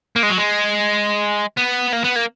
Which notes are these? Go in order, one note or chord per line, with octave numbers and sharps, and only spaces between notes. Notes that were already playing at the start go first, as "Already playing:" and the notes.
A#3
G#3
F#3
G#3
B3
A#3
B3
A#3